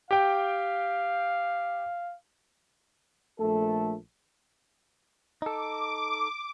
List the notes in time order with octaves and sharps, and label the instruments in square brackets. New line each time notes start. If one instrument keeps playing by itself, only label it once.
[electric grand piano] G4 G5 [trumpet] F5
[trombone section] A#1 A3 A4
[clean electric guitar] D#4 A4 [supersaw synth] D6